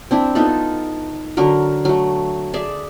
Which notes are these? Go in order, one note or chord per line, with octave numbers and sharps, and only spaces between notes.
C4 D4 E4
B3 D#4 F4 A4
D3 F#3 F#4 A#4
F#3 A3
G#4 D5 E5